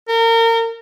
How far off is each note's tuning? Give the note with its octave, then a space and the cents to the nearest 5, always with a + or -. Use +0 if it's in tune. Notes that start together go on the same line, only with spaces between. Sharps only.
A#4 -30